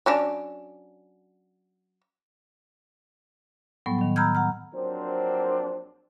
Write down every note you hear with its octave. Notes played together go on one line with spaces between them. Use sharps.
F#3 C#4 D4
A2 F#3 G3 B3
A2 D#3
A#5 B5 E6 F6 G6 G#6
F#5 A#5 F6
A#1 F#3 C4 D4 A#4 C5